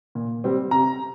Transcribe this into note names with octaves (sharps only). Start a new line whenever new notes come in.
A#2
G3 C4
C3 A#5